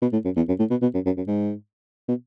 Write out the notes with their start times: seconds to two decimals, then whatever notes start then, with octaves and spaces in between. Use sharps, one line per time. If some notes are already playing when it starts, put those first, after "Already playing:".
0.02 B2
0.13 A2
0.25 F#2
0.37 E2
0.48 F#2
0.59 A2
0.70 B2
0.82 B2
0.94 F#2
1.06 F#2
1.17 F#2
1.28 G#2
2.08 B2